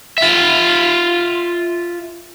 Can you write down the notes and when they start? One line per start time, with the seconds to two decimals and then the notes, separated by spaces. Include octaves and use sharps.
0.18 F4 E5